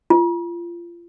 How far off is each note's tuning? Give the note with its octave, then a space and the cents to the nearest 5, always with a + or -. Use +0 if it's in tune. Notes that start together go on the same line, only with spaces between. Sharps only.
F4 -25